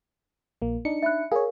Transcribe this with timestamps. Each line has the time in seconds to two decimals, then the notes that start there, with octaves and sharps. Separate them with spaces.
0.62 A#1 A#3
0.85 D4 D#4 C#7
1.03 E5 B5 F#6
1.32 G#4 A#4 C#5 F5